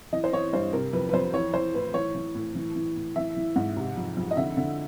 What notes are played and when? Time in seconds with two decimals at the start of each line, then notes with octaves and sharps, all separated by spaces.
0.13 E3 D#5
0.24 C5
0.33 E3 C#5
0.53 G2 C5
0.73 C3 A#4
0.93 F2 B4
1.09 B4
1.13 F2 C5
1.34 E3 C#5
1.54 E3 C5
1.74 A2 B4
1.94 E3 C#5
2.15 E3
2.35 A2
2.55 E3
2.76 E3
2.96 A2
3.16 E3 E5
3.36 E3
3.56 G#2
3.77 C3
3.97 F2
4.17 F2
4.31 D#5
4.37 D3 E5
4.57 D3